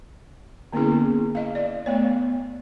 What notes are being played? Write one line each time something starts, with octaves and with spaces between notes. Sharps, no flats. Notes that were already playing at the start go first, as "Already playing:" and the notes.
D3 A#3 B3 C#4 E4 G#4
D#5 F5
D5
A3 B3 C#5